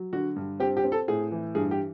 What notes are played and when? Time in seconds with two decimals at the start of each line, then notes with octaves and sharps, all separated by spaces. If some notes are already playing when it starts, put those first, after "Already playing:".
Already playing: F#3
0.13 D3 F#4
0.36 G2
0.60 C4 G4
0.77 G4
0.84 C4
0.92 A4
1.08 A2 G#4
1.31 E3
1.55 G2 G#4
1.71 G4